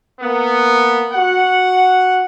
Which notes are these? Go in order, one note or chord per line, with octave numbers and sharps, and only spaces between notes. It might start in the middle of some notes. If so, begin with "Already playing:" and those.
A#3 B3
F#4 F#5